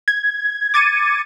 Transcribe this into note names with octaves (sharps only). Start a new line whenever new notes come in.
G#6
D6 G#6 A6 C#7 D#7